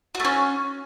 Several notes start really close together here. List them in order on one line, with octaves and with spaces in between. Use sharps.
F#4 A3 C#4